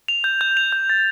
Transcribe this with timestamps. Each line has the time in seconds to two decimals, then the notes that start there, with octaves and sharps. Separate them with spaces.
0.08 F7
0.24 G6
0.41 G6
0.57 F7
0.72 G6
0.90 A6